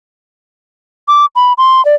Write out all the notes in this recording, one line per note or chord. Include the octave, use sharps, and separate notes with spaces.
D6
B5
C6
D5